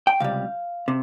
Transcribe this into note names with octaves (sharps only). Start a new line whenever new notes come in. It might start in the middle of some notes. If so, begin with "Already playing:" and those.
G5
C#2 C3 G3 F5
C3